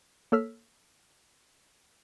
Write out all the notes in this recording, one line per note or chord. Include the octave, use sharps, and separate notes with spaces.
A#3 A4 C#5 E6 F6 B6